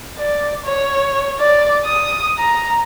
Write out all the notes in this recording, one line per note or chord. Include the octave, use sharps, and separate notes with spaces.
D5
C#5
D5
D#6
A#5